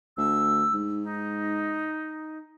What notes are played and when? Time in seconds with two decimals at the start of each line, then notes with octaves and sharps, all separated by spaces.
0.17 D2 E6
0.73 G#2
1.03 D#4